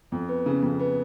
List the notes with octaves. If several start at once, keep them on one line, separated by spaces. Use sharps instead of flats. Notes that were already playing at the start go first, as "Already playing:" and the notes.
F2
B3
C#3
F2
B3